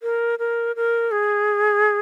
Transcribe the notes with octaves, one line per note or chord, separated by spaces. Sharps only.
A#4
A#4
A#4
G#4